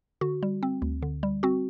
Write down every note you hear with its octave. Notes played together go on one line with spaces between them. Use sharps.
D3 F#4
G3
C4
D2
D3
G3
C4 F#4